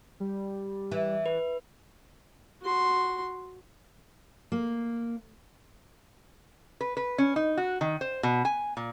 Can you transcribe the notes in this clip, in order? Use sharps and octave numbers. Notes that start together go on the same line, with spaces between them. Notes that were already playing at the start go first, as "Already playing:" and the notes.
G3
E3
B4
F#4 C6
A#3
B4
B4
C#4
D#4
F#4
D#3
C5
B2
G#5
A#2